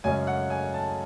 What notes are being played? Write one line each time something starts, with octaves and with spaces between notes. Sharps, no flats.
F#2 C#3 G#3 C#4 G#5
F#5
G#5
A5